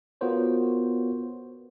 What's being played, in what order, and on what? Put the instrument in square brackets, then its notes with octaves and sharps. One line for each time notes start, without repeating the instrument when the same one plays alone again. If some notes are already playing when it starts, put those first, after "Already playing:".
[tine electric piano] B3 F4 F#4 A#4 C5 C#5